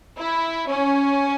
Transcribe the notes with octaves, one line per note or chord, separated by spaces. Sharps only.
E4
C#4